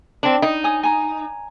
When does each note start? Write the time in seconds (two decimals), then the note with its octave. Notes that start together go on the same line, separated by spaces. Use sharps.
0.23 C4 D4
0.42 D#4
0.63 C#5 G#5 D#6
0.83 G#5 A#5